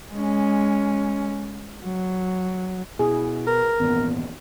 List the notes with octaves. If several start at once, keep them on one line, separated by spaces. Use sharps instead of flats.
G#3 C#4
F#3
B2 E4 G#4
A#4 B4
G#1 E2 A#2 B3